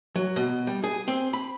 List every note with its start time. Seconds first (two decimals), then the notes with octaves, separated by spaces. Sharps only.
0.16 F#3
0.36 B2
0.67 G3
0.84 G#4
1.08 C4
1.33 B5